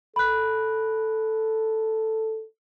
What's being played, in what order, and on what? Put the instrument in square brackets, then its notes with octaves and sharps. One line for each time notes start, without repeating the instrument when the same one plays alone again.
[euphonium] A4 [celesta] B5 F#6